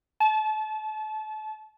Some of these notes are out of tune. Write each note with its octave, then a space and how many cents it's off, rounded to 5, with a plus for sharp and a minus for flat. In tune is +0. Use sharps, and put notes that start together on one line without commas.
A5 -30